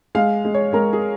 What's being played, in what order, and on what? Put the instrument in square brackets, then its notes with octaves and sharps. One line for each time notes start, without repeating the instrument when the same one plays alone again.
[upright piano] G#3 F5
G#3
C#5
G#3 A#4
G#4